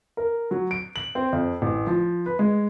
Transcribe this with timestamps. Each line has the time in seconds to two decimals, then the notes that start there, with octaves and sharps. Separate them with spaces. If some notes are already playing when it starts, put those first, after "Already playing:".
0.17 A#4
0.51 F#3
0.71 D7
0.96 F#7
1.15 C4
1.33 F2
1.62 A1
1.87 F3
2.26 B4
2.39 G#3